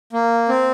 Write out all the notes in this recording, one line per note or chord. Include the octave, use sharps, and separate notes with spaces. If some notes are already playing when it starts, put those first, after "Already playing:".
A#3
C4